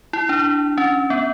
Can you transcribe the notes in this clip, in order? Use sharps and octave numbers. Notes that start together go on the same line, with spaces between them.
E4
D4
C#4
B3